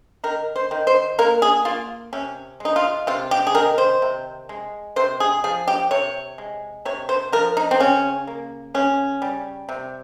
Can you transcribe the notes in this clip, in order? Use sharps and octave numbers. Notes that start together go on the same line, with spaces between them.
D#3 A#4
C5
D#3
C5
A#3 A#4
G#4
A#3 F4
C3 C#4
G#3 D#4
F4
C3 F4
G4
G#4
D#3 A#4
C5
C3
G#3
C3 C5
G#4
F3 G#4
G4
C3 C#5
G#3
C3 C#5
C5
F3 A#4
D#4
C4
C#3 C#4
A#3
C#3 C#4
G3
C3